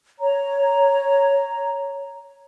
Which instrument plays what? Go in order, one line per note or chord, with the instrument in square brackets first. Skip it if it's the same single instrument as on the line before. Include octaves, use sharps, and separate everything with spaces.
[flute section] C#5 A#5